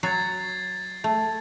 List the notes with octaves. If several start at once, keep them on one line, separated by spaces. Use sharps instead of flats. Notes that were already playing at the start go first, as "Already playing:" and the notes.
F#3 F#4 G#6 A6 C7
A3